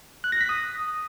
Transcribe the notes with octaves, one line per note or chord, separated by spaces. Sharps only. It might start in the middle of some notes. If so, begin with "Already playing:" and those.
F#6
A#6
B6
D#6